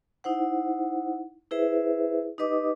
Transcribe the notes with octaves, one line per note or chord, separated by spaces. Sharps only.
D#4 E4 C5 F#5
E4 G#4 B4 C5 E5
D#4 G4 B4 D#5 D6 D#6